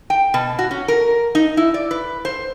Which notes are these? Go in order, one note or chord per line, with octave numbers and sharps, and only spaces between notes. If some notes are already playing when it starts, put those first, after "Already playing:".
G5
B2
F#4
C#4
A#4
D#4
E4
D5
B4
C5